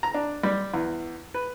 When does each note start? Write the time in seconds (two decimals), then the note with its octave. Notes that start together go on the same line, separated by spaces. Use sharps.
0.03 A#5
0.14 D4
0.43 G3
0.74 E2
1.34 B4